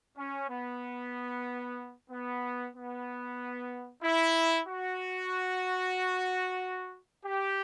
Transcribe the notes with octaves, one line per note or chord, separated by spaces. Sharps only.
C#4
B3
B3
B3
E4
F#4
G4